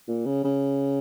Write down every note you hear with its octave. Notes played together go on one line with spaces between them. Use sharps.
A#2
C#3
C#3